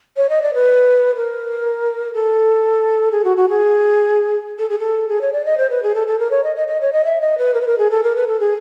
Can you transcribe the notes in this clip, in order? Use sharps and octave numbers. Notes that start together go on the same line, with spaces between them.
C#5
D#5
D5
B4
A#4
A4
G#4
F#4
F#4
G#4
A4
G#4
A4
G#4
C#5
D5
D#5
C5
B4
G#4
A4
A4
A#4
C#5
D#5
D#5
D#5
C#5
D#5
E5
D#5
B4
A#4
B4
A#4
G#4
A4
A#4
B4
A4
G#4